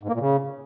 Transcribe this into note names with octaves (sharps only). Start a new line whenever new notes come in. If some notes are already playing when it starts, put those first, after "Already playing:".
G#2
A#3
A#2
C#3